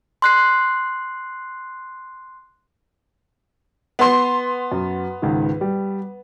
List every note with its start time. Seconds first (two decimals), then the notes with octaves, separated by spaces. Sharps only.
0.22 C6 F#6 C7
3.99 B3 C6
4.72 F#2
5.22 C#2 G#2 D#3
5.61 G3